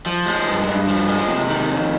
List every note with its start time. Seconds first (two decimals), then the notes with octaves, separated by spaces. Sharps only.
0.06 F3
0.26 G#3
0.46 G2
0.67 G2
0.87 F3
1.08 G#3
1.28 C3
1.49 D#3
1.69 F2